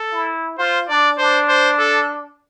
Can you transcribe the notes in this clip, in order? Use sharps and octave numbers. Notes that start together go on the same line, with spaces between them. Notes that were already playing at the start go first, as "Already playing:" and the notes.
Already playing: A4
E4
F4 C5
D4 D5
D4 C5
C5
A4